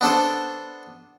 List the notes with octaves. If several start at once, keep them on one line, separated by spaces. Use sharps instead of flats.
B3 D4 A4 C5